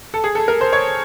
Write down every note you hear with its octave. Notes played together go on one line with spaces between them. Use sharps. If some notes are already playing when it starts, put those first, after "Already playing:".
A4
G#4
A4
A#4
C5
C#5